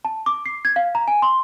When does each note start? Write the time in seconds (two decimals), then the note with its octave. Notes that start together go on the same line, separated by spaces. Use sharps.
0.05 A5
0.26 D6
0.46 C7
0.65 G#6
0.76 F5
0.95 A#5
1.08 G#5
1.22 C6